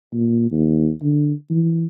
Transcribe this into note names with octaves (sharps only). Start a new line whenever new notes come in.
A#2
D#2
D3
E3